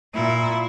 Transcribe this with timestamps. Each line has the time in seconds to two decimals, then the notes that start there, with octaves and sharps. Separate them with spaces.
0.14 A#2 E4